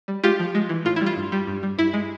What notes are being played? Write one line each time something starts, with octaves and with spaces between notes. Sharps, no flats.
G3
G#3 F4 G4
F3
G#3
E3
A2 F4
E4
G3
F4
G2
G3
G2
G3
G2 E4
G#3